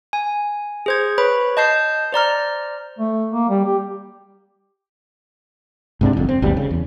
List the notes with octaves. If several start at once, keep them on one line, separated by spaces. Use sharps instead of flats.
G#5
G#4 C5 G#6
B4 C#5 B5
D#5 A5 G6 C7
C5 D5 A#5 F6
A3
A#3
G3
G4
G#2 C3 D4
G1 F2
C4
G#1 D#2 B2 G3
C#3
E2